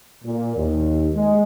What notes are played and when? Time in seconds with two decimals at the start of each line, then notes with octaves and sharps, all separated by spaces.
0.24 A#2
0.57 D#2
1.14 G#3